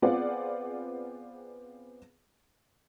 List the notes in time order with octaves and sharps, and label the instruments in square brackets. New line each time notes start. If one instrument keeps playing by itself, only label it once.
[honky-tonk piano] B3 C4 F4 G#4 D5 F#5